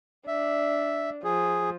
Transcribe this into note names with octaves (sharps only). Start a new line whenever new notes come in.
D4 E5
F3 G#4